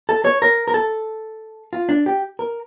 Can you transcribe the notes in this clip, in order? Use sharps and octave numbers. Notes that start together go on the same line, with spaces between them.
A4
C#5
A#4
A#4
A4
F4
D4
G4
A#4